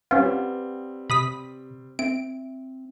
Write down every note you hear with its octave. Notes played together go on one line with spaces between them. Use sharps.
G3 C4 C#4 F4 B4 F5 F#5
C3 B5 D#6 B6
C4 E5 D7